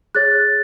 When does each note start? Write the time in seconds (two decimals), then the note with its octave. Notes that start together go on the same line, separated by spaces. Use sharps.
0.15 G#4 C#5 F#6 A6